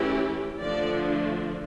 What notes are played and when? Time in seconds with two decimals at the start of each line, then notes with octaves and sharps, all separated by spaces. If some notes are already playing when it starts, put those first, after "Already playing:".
Already playing: E3 A3 C#4 E4 G4
0.61 D3 F3 A3 D4 D5